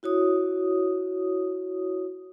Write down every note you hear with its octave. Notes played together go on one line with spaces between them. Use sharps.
E4 F#4 C#5 D#6